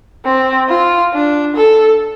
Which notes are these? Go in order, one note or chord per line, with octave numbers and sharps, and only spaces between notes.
C4
F4
D4
A4